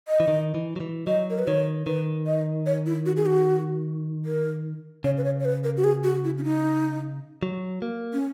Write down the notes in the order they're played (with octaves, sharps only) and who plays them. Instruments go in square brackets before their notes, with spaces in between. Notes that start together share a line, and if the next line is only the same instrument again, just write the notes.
[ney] D#5
[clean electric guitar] E3
D#3
E3
F#3
E3
[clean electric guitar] F#3 [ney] D#5
[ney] A#4
B4
[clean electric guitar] D#3 [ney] C#5
[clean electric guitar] D#3 [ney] B4
[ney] D#5
C#5
E4
F#4
G#4
F#4
A#4
[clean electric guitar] C#3 [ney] C#5
[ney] B4
C#5
C#5
B4
A#4
F#4
G#4
F#4
E4
C#4
D#4
[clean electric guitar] F#3
A#3
[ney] C#4